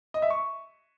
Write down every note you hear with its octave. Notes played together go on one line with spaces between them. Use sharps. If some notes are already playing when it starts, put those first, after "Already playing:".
D#5
E5
C#6